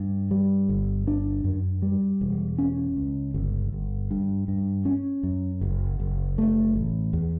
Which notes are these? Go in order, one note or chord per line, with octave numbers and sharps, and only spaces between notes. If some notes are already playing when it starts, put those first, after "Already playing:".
Already playing: G2
G3
G1
D4
F#2
G3
E1
C#4
C#2
G1
G1
G2
G2
C#4
F#2
F#1
F#1
A3
A1
E2